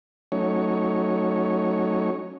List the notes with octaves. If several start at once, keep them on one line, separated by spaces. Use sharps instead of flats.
F#3 A3 C#4 D#4 C#5